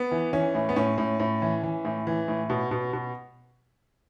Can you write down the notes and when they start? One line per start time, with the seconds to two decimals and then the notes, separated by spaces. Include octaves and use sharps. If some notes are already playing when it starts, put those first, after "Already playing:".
Already playing: B3
0.11 E3
0.33 E3 C#4
0.55 A2
0.69 B3
0.76 A2 C#4
0.98 A2
1.20 A2
1.42 E3
1.63 E3
1.85 A2
2.07 E3
2.28 A2
2.50 B2
2.71 B2
2.93 B2